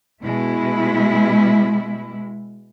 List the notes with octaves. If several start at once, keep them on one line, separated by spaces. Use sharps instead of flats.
B2 G#3 E4